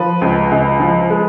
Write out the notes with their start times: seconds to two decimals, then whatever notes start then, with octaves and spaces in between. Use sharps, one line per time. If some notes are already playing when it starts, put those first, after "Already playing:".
Already playing: F3 B4
0.22 C#2
0.51 C#2
0.80 F3
1.10 G#3